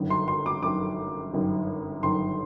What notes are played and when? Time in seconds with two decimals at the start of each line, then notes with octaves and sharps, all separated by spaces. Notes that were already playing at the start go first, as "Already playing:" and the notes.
Already playing: G1 F#2 D#3
0.10 C6
0.28 C6
0.46 D6
0.63 G1 F#2 D#3 D6
1.33 G1 F#2 D#3
2.03 G1 F#2 D#3 C6